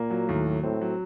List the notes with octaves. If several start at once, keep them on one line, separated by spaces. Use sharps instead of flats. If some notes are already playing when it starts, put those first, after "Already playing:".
Already playing: A#2 A#3
F#3
D#2 A2
F#3
A2 C4
F#3